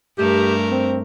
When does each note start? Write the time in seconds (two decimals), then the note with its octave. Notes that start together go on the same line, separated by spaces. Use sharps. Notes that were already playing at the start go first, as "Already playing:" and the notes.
0.18 G2 A3 G4 A#4
0.71 C4